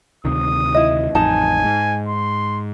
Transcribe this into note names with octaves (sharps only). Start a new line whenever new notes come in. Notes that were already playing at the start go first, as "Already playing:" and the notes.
D2 C3 D#3 D#6
E4 D#5
A1 F2 D#4 G#5 A5
G#2
C6